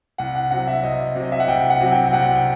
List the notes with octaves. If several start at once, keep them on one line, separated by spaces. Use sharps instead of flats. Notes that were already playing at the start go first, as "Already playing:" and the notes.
C2 F#5
F#5
C3 F#3 F#5
E5
C2 D#5
C3 F#3
D#5
E5
F#5
C2 G5
F#5
C3 F#3
G5
G5
C2 F#5
G5